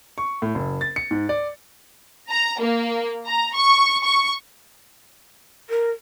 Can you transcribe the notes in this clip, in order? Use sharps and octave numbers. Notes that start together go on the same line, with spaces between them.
C#6
A2
F#1
A6
C#7
G#2
D5
A#5
A#3
A#5
C#6
C#6
A#4